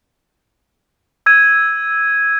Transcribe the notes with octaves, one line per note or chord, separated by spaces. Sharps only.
E6 G#6 D#7